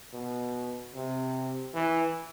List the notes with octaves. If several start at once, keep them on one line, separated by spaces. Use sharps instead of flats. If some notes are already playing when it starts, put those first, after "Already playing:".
B2
C3
E3